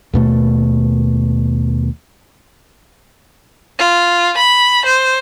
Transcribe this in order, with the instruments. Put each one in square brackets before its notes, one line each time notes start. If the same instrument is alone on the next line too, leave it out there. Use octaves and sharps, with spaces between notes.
[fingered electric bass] D#2 B2 A3
[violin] F4
B5
C5